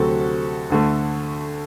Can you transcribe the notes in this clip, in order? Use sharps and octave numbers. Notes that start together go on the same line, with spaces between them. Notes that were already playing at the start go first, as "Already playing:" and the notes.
Already playing: D2 C3 F#3 A3 C4 F#4 A4
D2 D3 A3